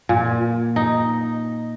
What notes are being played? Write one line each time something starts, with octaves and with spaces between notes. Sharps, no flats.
A#2
D#4